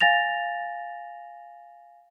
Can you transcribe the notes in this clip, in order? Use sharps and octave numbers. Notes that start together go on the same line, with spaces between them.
F5 G#5 A6 A#6 F7